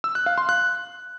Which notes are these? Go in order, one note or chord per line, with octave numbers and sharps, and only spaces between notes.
E6
F#6
F5
C6
F#6